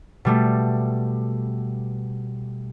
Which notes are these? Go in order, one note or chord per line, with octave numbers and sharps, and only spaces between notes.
B2 G3 A3